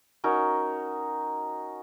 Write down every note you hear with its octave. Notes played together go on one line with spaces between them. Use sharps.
C#4 D#4 F#4 A#4